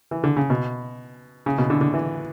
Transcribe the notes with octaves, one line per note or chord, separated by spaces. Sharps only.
E3
D3
C#3
B2
C#3
B2
D3
D3
E3